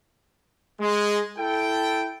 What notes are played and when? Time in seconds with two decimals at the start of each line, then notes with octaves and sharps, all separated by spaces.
0.80 G#3
1.38 E4 A4 G5